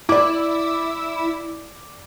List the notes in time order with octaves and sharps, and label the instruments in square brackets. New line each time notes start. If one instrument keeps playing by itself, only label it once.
[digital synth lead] E4 [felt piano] D5 D6